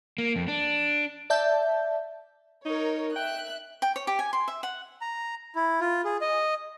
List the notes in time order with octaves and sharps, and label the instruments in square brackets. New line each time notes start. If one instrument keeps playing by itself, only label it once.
[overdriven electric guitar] A#3
F2
D4
[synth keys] D5 E5 A5 G6
[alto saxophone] D#4 [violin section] A#4 C#5
[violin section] E5 F#6 [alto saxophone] G5
[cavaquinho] G5
C#5
G4
G#5
C6
E5
F#5
[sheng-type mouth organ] A#5
E4
F4
G#4
D#5